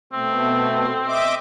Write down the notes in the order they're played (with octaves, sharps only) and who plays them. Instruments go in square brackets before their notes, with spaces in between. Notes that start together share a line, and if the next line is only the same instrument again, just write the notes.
[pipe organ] B2 A3 [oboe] C4
[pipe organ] D#5 E5 D6